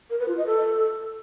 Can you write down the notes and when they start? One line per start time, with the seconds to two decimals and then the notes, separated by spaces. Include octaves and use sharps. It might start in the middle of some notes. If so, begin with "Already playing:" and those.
0.10 A#4
0.19 B4
0.28 F4
0.37 D#5
0.46 A4